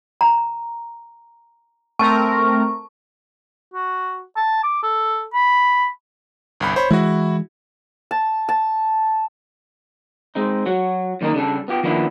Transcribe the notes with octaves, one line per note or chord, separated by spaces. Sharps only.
A#5
A3 C4 A#4 A5 C#6
F#4
A5
D6
A4
B5
G1 C2 B5
C5 C#5 B5
E3 G#3 E4 F#4
A5
A5
G#3 C4 D#4
F#3 F#4
F#2 D#3 A#3 B3 D#4
C#3 G3 D4 A4
B3 F4 G4
D#3 F3 A#3 B3 D4 E4